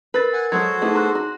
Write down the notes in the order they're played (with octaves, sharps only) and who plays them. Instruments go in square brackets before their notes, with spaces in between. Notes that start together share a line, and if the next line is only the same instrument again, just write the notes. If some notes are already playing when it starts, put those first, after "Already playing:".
[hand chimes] A#4 A6 [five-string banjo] B4
[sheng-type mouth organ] F#5 G#5
[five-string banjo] F#3 G#3 [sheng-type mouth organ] F#4 A4 C5 [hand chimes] G#6
[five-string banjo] A3 B3 E4 [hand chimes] D#4 G#4
[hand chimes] A#5 C6 F#6
[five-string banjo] F#4 [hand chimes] A#5